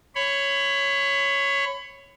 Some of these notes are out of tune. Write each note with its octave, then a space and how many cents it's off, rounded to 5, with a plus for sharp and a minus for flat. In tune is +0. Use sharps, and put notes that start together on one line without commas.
C#5 +0 B5 +25